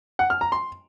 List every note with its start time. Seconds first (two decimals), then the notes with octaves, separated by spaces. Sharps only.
0.19 F#5
0.30 F6
0.41 A#5
0.52 C6